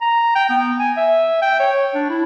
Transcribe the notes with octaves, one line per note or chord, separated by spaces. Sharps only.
A#5
G5
B3
G#5
E5
G5
C#5
D4
E4